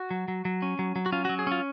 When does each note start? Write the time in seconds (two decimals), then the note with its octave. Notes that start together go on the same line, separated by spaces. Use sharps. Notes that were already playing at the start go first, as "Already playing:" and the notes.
Already playing: F#4
0.11 F#3
0.28 F#3
0.45 F#3
0.62 C#4
0.79 F#3
0.96 F#3
1.06 F#4
1.12 C#4 F4
1.25 F#4
1.29 F#3
1.39 G#4
1.47 C#4 F4